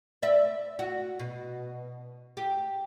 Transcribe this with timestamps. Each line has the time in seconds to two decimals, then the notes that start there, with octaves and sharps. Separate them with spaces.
0.22 D5 E5
0.79 F#4
1.19 B2
2.37 G4